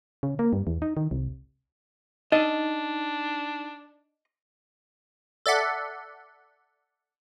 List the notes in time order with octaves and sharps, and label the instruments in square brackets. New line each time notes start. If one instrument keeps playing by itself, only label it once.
[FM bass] C#3
A#3
G2
E2
D#4
D#3
C2
[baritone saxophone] D4 [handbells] D#4 [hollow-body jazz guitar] D#5
[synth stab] A4 D5 E5 F#5